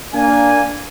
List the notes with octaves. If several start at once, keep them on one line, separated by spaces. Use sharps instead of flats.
A#3 D4 G#5